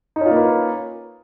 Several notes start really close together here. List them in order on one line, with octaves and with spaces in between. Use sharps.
D#4 C#4 F4 A#3 B4